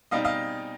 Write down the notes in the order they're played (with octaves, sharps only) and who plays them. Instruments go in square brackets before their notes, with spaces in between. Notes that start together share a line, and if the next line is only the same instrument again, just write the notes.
[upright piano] B2 G3 C4 D#4 D#5 F5
D#5 F5